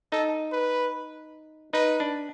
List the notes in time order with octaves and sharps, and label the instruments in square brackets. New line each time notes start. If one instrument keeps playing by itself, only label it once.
[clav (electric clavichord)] D#4 [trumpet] A4
[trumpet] B4
[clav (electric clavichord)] D#4 [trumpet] B4
[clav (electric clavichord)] D4